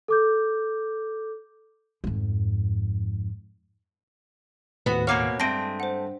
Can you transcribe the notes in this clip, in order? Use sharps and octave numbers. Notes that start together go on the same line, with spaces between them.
A4 D6 G6
F2 G#2
D#2 A2 B3 F#4
B2 A#3 C#5 F5 F#5 D6 F6
G2 G#3 A3 C4 A5 A#6 C7 D7
C5 F#5